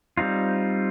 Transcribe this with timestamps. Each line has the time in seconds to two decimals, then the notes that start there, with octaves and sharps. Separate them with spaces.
0.17 G3 C4 D#4 F4